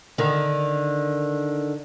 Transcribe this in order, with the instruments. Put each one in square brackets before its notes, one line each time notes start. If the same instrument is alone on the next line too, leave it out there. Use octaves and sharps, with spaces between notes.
[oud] D3 D#3